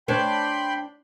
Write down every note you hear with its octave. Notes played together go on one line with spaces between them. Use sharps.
D4 C5 C#5 G5 B5 C6